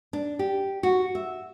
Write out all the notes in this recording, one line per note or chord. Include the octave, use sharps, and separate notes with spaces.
D4
G4
F#4
E5